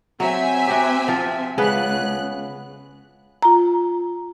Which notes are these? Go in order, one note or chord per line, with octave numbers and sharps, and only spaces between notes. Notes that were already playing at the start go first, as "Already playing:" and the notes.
F#3 C4 E5 G#5
F#4 G4
F3 F4
C#2 C#3 B3 B4 F#6
F4 A#5